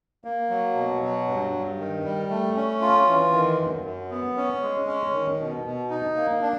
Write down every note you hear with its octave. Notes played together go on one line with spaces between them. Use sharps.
A#3
F#3
B2
F#3
G2
G2
D#3
G3
A3
C#4
F4
E3
D#3
F#2
F#2
B3
C#4
G#3
C#4
D#3
B2
B2
D#4
A#3
D4